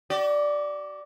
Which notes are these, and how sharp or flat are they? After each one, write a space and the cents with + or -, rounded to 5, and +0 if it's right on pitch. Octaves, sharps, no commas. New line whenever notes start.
F#4 +45 D5 +0